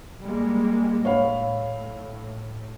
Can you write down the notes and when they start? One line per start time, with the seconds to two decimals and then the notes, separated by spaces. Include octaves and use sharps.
0.23 G3 G#3 A#3
1.05 A2 C#5 F5 B5